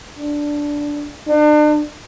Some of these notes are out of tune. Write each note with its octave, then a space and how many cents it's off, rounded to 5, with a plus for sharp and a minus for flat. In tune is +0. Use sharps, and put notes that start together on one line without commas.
D4 -5
D4 +40